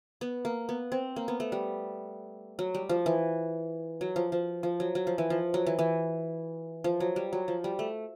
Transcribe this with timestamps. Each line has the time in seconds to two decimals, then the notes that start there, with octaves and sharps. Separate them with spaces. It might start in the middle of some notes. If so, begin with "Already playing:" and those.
0.21 B3
0.45 A#3
0.69 B3
0.92 C4
1.16 A#3
1.28 B3
1.40 A3
1.52 G3
2.59 F#3
2.74 G3
2.89 F3
3.06 E3
4.01 F#3
4.16 F3
4.32 F3
4.63 F3
4.80 F#3
4.95 F#3
5.07 F3
5.18 E3
5.30 F3
5.54 F#3
5.67 E3
5.79 E3
6.84 F3
7.00 F#3
7.16 G3
7.33 F#3
7.48 F3
7.64 G3
7.79 A3